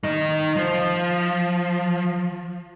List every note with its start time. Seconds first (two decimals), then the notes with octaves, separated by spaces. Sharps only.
0.04 D#3 D#5
0.56 F3